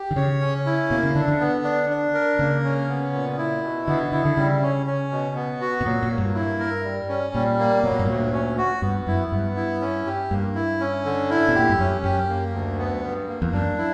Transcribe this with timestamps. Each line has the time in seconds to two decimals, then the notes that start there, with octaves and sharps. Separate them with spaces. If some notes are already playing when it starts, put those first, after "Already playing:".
Already playing: G4
0.11 D3
0.16 C#3 C#5
0.41 C#4
0.66 E4
0.90 B2 A#3
1.03 C#3
1.15 D3 D4
1.28 D3
1.40 B3
1.64 D4
1.90 D4
2.14 A#4
2.39 C#3 A#3
2.64 C#4
2.89 B3
3.13 A#2
3.38 E4
3.63 B2
3.88 D3 B3
4.12 D3 E4
4.25 D3
4.37 C#3 G3
4.62 C#4
4.86 C#4
5.11 B2
5.36 B3
5.61 F#4
5.81 B2
5.85 A#2 F#3
6.03 A#2
6.11 A#3
6.18 G2
6.35 E4
6.60 A#4
6.84 G3
7.09 C#4
7.34 A#2 G3
7.59 A#3
7.83 B2 F#3
7.92 A#2
7.99 G2
8.06 D2 A#2
8.33 C#4
8.58 F#4
8.82 G2 B3
9.07 F#2 E4
9.32 G2 B3
9.56 E4
9.81 C#4
10.06 G4
10.31 G2 A#3
10.55 E4
10.80 C#4
11.05 D3
11.30 E4
11.48 B2
11.55 A#2 G4
11.69 G2
11.79 F#2 C#4
12.04 F#2 G4
12.29 A#3
12.53 D2
12.79 B3
13.03 G2
13.28 A#3
13.42 E2
13.52 F#2 D4
13.78 E4